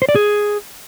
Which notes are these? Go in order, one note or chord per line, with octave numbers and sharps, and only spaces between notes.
C5
D5
G#4